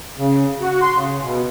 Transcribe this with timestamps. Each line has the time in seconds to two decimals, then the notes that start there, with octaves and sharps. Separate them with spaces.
0.18 C#3
0.61 F#4
0.81 C6
0.95 C#3
1.22 B2